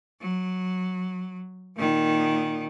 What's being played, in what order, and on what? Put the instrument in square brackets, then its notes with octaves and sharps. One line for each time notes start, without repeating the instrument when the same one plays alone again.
[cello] F#3
A#2 D#3